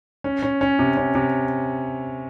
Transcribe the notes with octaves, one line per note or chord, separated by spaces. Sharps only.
C#4
C#4
C#4
C3
C#4
C3